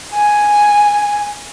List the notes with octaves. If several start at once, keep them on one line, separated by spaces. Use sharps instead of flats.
G#5